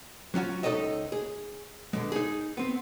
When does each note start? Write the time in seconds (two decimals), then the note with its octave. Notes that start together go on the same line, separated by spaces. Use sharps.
0.34 F#3 C#4 F4 F#4
0.63 C#2 D#4 A4 C#5 D#5 E5
1.12 G#4
1.93 B2 D3 G#3
2.12 D#4 G#4
2.57 B3 C4